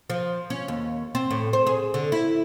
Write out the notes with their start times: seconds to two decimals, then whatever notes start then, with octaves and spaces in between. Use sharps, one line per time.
0.10 F3
0.50 C#4
0.68 D#2
1.15 C4
1.31 A2
1.53 C5
1.67 G#4
1.94 D3
2.12 E4